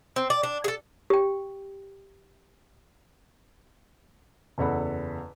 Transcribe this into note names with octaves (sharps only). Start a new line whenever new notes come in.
C4
D5
D4
G#4 A4
G4 G5
F#1 E2 A4 F#5 B5